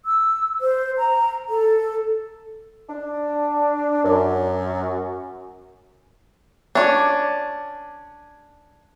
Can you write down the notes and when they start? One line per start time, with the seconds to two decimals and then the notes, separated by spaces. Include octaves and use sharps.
0.05 E6
0.61 C5
0.98 A#5
1.49 A4
2.89 D4
4.04 F#2
6.75 C#4 D4